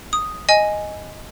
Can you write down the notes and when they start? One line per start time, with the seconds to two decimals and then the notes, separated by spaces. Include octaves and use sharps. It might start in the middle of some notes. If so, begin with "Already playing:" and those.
0.13 D#6
0.49 D#5 G#5